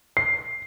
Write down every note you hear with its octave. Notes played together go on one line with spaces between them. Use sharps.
C7